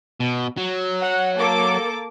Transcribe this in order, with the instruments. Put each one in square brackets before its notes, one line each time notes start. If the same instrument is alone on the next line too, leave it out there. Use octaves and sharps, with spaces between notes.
[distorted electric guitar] B2
F#3
[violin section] F#5
A#3 A4 D6